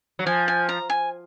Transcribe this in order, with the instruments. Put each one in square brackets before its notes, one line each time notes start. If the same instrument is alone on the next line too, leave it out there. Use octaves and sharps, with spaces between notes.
[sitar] F#3
[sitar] F3 [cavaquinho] G#5
[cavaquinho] G#5
A#5
G#5